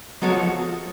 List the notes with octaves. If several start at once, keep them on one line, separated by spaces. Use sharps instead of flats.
F#3 G#3 B3 F#4 A4 C#5
F3